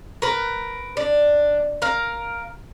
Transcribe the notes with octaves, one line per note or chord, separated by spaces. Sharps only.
A#4 B4
D4
A#4 F5